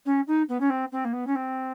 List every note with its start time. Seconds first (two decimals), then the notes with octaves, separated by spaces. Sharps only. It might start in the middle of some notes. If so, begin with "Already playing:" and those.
0.06 C#4
0.27 D#4
0.49 B3
0.60 C#4
0.70 C4
0.92 C4
1.05 A#3
1.13 B3
1.27 C#4
1.35 C4